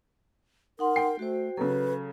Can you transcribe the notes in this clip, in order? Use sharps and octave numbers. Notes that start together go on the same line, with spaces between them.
D#4 A#4 F#5 C6
G5 C7
A3 F#4 C5
C#3 F#3 A4 B4